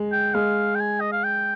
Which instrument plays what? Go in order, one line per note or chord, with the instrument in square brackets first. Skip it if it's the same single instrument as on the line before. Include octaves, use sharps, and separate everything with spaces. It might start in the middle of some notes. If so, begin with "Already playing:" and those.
Already playing: [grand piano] G#3
[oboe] G5
[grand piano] G#3 [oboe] F5
[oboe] G5
G#5
D#5
F5
G5